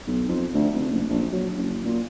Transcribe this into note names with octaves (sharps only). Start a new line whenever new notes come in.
B1
F2
D2
F1
F#1
A#1
F#3
F#1
A#2